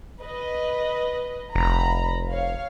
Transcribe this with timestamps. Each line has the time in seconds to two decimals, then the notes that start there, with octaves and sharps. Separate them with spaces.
0.21 B4 D#5
1.55 F1 A#5 B5
2.31 C#5 F5